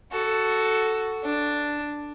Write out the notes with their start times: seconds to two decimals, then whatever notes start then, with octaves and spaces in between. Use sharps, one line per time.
0.12 F#4 A4
1.24 D4